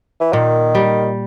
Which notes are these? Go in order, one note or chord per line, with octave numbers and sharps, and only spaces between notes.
E3
A#2 D#3
G3